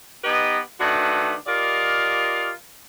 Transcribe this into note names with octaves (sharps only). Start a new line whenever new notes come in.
B3 D#4 G4 B4 D#5
D#3 A3 D4 F#4 A4 B4
F4 G4 A#4 D5 D#5 F5